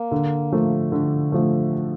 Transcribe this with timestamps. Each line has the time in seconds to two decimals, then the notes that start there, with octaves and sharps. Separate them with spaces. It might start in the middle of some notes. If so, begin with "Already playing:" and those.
Already playing: A#3
0.11 D3
0.52 F3 A3
0.92 D3
1.32 F3 A3